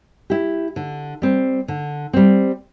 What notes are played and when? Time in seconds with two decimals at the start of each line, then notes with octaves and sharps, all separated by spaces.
0.30 E4 G4
0.76 D3
1.22 G3 C4
1.68 D3
2.13 G3 C4